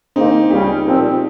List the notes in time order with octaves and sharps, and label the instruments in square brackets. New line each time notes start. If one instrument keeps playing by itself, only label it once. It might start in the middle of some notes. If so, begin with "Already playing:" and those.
[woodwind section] G#2 D#3 A#3 [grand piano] C4 D#4
[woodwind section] C#2 C#3 G3 C#4 [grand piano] D#4 G4
[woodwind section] A#2 F3 C4